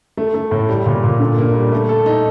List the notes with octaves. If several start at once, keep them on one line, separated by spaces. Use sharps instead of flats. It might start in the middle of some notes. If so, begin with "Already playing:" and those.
A3
A3
A2
G3
A#2
A#2
D3
A#3
G3
A3
A4
D#4